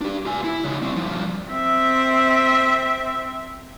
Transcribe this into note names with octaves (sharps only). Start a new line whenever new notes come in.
D4 G4
F4 G#5
E4
C#3 D#4
G3 C4
G2 F3
C4 E5